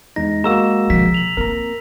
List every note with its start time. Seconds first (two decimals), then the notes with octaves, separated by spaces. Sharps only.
0.16 E2 G#3 D#4 A#6
0.44 G#3 A#3 F#4 A#5 E6 E7
0.90 C3 F3 B6
1.14 F7 F#7
1.37 A#3 C4 A#4 A#5